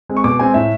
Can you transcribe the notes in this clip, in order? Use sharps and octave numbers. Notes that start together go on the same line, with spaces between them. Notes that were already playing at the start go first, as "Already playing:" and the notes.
G#3 C4
C#6
B2 D6
G#3 C4 G#5
A2 E5